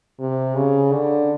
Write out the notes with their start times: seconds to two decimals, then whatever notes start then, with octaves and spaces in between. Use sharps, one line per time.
0.20 C3
0.56 C#3
0.92 D3